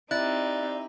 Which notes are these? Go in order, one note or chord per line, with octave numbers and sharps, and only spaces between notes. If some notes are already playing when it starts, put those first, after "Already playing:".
C4 D#4 E4 G4 D5 F#6 A6